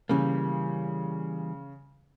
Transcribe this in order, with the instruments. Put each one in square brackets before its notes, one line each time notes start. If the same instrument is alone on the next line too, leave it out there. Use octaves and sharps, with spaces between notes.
[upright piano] C#3 [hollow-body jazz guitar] E3 G3 A#3